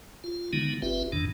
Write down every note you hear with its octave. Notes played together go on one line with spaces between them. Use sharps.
F4
D3 D#3 G#3 B3 D#4
G1 C4 F4 G4 B4 E5
E2 G#2 D#3 D4